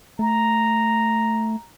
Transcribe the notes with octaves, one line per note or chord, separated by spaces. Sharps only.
A3 A#5